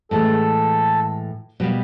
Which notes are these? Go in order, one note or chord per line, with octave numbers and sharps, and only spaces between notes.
A2 E3 G#3 A4
B2 G3 A#3